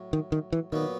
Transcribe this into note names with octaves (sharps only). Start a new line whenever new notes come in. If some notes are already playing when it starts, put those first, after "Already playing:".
Already playing: A2 F#3
D#3
D#3
E3
A#2 D#3 F#3 B3